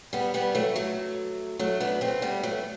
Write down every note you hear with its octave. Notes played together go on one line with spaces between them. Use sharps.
G3 B3
G3 B3
F#3 A3
F#3 A3
F#3 A3
B3 D4
A3 C4
G3 B3
F#3 A3